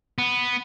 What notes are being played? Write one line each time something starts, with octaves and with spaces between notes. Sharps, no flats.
B3